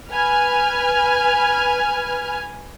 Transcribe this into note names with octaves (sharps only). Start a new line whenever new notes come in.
B4 G#5 F6